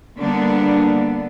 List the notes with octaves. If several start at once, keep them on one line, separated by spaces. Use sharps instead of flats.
D3 G3 A#3 B3 D4